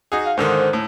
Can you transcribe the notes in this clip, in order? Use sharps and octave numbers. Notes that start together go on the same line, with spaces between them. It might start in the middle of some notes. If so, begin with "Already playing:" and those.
D#4 F#4 G#4
F5
G#2 D3 D#3 C5
A2